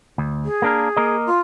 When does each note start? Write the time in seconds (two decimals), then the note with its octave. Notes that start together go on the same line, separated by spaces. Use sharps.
0.18 D2
0.45 G#4
0.62 A#3 D4 A#4
0.97 A#3 A#4 D#5
1.26 F4